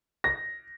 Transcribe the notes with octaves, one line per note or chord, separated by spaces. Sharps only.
A#6